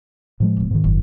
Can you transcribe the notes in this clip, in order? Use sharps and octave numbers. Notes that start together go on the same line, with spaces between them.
A2 F3 G#3
D1 B2
G#2 D#3
F#1